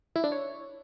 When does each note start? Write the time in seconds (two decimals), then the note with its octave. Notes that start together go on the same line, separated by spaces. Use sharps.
0.16 E4
0.24 D4
0.32 C#5